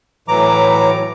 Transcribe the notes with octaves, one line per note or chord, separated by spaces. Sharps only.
A2 E3 F#3 A#5 D6